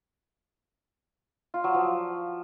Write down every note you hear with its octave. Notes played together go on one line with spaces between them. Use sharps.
F4
F#3
F3